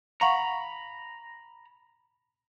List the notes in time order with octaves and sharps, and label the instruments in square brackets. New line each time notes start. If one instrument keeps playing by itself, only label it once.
[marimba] F5 F#5 C#6 [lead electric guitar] A#5 B5